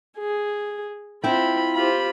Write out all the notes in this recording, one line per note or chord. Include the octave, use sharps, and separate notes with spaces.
G#4
C4 E4 F4 G5 B5
F4 G4 C5 B5